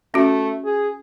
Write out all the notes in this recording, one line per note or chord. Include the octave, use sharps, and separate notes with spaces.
A3 C#4 F#4
G#4